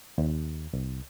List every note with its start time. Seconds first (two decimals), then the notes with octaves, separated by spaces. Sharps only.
0.18 D#2
0.73 C2